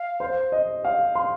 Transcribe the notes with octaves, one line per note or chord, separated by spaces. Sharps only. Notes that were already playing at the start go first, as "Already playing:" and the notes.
Already playing: F5
C5
D#5
F5
C6